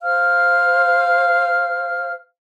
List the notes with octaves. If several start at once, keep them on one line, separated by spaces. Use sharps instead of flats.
C5 F5 F6